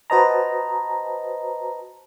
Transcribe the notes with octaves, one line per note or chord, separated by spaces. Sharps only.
F#4 B4 C5 D#5 A5 A#5